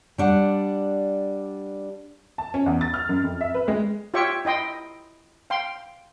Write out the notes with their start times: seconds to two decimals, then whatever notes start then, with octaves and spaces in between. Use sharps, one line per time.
0.18 G3 D4 F#5
2.38 A5
2.54 C#4
2.66 E2
2.81 A6
2.94 F6
3.09 F#2
3.23 F2
3.41 E5
3.54 B4
3.68 G#3
4.14 F4 G4 C#5 E5 G5 C#6
4.45 E4 D#5 G5 C6
5.50 F5 G5 C6